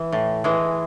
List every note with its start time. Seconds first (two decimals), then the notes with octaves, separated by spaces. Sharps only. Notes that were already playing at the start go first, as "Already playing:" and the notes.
Already playing: E3
0.12 A2
0.44 E3 G#3